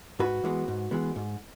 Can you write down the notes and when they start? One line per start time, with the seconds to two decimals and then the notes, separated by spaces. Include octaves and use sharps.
0.19 G#2 F#4 B4
0.44 E3 G#3 B3
0.68 G#2
0.91 E3 G#3 B3
1.16 G#2